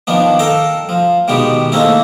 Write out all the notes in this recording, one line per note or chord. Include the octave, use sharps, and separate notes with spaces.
D#3 F3 B3 D4
A4 A#4 F5 G5 A#5
F3
B2 D#3 G#3 B3 G4
A3 A#3 C4 C#4 D#4 E4